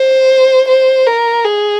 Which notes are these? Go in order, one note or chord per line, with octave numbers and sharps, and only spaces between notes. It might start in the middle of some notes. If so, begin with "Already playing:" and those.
Already playing: C5
C5
A#4
G#4